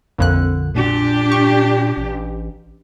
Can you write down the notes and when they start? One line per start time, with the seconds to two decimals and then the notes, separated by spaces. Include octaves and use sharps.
0.18 A#1 F2 D3 F#6
0.75 A#2 D4 G4
1.32 C#6
1.97 A1